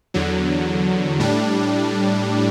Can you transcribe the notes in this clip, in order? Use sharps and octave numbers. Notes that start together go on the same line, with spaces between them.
E2 D3 F#3
A2 G3 D4